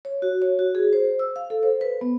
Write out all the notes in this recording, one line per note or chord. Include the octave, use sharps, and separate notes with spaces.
C#5
F#4
C#5
F#4
G#4
C5
E6
F5
A4
C5
B4
B3